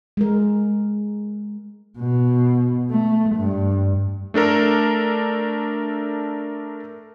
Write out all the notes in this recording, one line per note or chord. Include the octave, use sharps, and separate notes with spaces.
G#3 A#4
B2
A3
G2
A3 D4 A4 A#4